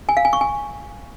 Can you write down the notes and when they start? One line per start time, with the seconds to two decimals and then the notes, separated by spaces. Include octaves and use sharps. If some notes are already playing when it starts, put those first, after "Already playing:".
0.09 G#5
0.17 F5
0.25 G#5
0.33 C#6
0.41 G#5